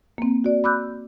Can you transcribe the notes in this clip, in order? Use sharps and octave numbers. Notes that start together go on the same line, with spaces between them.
A#3 C4
F#4 D5
B5 D6 E6 F#6 G6